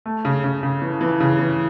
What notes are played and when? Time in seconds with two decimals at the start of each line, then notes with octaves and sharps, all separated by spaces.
0.06 A3
0.25 C#3
0.44 C#3
0.63 C#3
0.82 E3
1.01 E3
1.20 C#3
1.39 E3